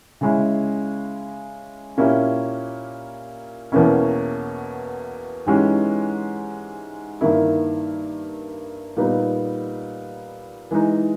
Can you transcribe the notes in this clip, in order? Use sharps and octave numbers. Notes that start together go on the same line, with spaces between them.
C#3 G#3 C#4 E4
A#2 A#3 C#4 E4 G4
E2 B2 A#3 C#4 E4
G#2 E3 G#3 C#4 G4
G2 D#3 A#3 E4
A#2 G3 B3 D#4
E3 G#3 D#4